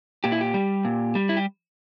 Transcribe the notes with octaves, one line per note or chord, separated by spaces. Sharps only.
A#2 G4
E4
G4
G3
A#2
G3
E4
G4